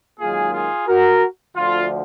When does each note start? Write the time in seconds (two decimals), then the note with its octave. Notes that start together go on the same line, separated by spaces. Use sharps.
0.20 G#2 D#3 F#3 A#3 F4 G#4
0.54 F4 G#4
0.88 F#4 A#4
1.56 D2 D3 F3 F4